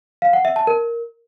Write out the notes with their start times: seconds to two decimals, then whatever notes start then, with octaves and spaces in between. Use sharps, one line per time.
0.22 F5
0.33 F#5
0.45 E5
0.56 A5
0.67 A#4